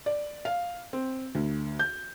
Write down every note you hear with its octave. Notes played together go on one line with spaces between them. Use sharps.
D5
F5
C4
D2
G6